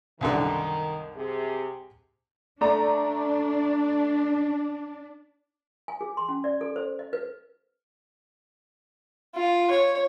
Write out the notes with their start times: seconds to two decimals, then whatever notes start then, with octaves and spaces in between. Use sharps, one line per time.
0.21 C2 F#2 D3 D#3
1.16 C3 G#4
2.61 A3 D4 D5 A#5
5.88 G#5
6.01 G#4
6.17 C6
6.29 C#4
6.44 D5
6.61 A4
6.76 C5
6.99 D#5
7.13 B4
9.35 F4
9.71 C#5